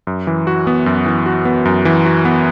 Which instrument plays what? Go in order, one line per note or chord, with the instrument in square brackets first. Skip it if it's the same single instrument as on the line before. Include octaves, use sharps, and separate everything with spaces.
[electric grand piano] F#2
E3
F#4
B3
F#2
E3
F#4
B3
F#2
E3
F#4
B3